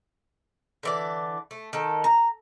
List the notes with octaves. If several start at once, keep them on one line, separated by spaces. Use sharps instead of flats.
D3 E3 D5
A3
D#3 A4
A#5